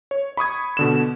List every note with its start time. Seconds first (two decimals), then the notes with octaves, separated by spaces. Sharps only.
0.11 C#5
0.37 B5 C#6 D#6 G#6
0.77 B2 D3 E7